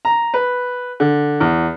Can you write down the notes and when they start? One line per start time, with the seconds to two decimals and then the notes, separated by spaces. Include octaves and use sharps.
0.05 A#5
0.34 B4
1.00 D3
1.40 E2